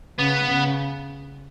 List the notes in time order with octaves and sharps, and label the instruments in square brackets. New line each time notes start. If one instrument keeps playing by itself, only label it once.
[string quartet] C#3 [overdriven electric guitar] B3
[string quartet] C#3